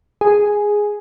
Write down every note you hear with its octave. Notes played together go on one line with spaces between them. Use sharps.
G#4